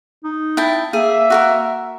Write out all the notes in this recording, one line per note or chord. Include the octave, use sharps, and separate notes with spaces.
D#4
E4 G5 A5
A#3 G#4 E5
F#4 A4 A#4